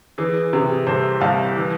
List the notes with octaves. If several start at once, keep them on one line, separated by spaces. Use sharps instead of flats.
E3 G#4
C3 G#4
C2 A4 C5
C2 F5 A5
E3